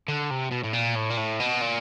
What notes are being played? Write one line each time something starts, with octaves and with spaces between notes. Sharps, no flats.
D3
C3
B2
A2
A#2
A2
A#2
A2
B2
A#2